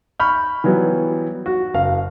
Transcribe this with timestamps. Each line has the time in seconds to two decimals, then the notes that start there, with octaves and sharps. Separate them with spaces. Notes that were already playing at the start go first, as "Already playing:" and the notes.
0.20 B5 C#6 F6 G6
0.64 E3 F#3 G3 B3
1.46 F#4
1.74 F#1 F5